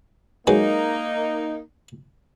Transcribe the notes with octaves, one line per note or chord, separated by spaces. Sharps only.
F#3 G#3 A#3 D#4 B4